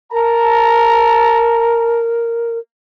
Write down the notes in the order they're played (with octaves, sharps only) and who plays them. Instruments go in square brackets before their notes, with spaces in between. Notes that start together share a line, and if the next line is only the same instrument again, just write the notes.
[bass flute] A#4 [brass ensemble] A5 A#5